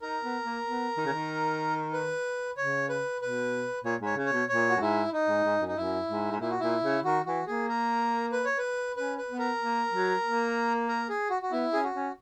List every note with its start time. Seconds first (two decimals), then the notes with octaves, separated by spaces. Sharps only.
0.02 D#4 A#4
0.23 B3
0.44 A#3
0.66 B3
0.97 D#3
1.06 C#3
1.13 D#3
1.93 B4
2.57 C#3 C#5
2.89 B4
3.21 B2 B4
3.84 A#2 C#5
4.01 G#2 C#5
4.16 C#3
4.26 C#5
4.33 B2
4.49 A#2 C#5
4.70 F#4
4.76 F#2
4.80 G#2 E4
5.13 D#4
5.28 G#2
5.44 G#2
5.61 F#2
5.68 D#4
5.77 F#2 E4
6.09 G#2
6.31 G#2
6.41 A#2 E4
6.50 F#4
6.60 A#2 E4
6.83 C#3
7.04 D#3 F#4
7.25 E3 F#4
7.47 A#3 G#4
7.68 A#4
8.32 B4
8.45 C#5
8.58 B4
8.96 C#4 B4
9.18 B4
9.28 B3
9.39 A#4
9.61 A#3
9.92 F#3
10.23 A#3
10.88 A#4
11.09 G#4
11.30 F#4
11.42 F#4
11.51 B3 E4
11.73 C#4 G#4
11.83 F#4
11.94 C#4